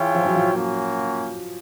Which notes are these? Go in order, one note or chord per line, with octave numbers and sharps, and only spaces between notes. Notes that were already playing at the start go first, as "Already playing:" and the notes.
Already playing: E3 F4 G#4 C#5 E5 G5
F3
F#3
F3
A#3 C#4 F#4